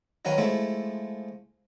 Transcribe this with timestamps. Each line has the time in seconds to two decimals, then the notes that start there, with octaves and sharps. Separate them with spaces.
0.25 D#3 F#3 C#4 B4 F5
0.38 F3 G#3 A3 E4